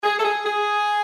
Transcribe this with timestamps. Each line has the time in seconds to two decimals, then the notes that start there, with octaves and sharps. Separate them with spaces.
0.04 G#4
0.18 A4
0.24 G#4
0.45 G#4